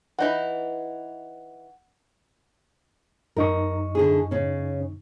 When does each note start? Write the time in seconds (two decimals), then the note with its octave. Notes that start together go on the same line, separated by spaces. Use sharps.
0.19 E3 D#4 E4 F#5
3.36 F#2 D#4 A#4 C#6
3.95 D3 E4 G#4
4.31 C#3 C#4